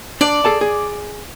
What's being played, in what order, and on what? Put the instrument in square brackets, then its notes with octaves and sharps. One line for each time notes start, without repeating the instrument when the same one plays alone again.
[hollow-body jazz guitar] D4 [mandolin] D5
[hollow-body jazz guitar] G#4 A4 A5
G#4